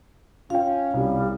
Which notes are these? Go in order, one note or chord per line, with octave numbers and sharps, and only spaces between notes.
C#4 F4 F5 G5
C2 G3